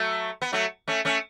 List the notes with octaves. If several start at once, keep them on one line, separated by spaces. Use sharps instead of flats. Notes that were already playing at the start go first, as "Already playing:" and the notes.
Already playing: F#3 A3
B3
F#3 A3
A3 C#4
A3 C#4